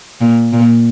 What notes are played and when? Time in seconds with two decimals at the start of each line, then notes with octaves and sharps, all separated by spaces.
0.20 A#2
0.53 A#2